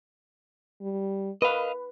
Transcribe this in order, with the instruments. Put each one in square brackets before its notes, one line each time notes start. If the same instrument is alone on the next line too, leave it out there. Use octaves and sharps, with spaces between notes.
[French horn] G3
[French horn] A#4 [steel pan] B4 [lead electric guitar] D#5 F5